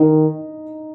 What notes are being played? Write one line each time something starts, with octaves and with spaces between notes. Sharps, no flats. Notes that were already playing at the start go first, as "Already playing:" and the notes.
Already playing: D#3 D#4 D#5